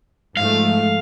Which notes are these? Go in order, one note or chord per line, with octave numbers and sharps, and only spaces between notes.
G#2 F3 A3 F5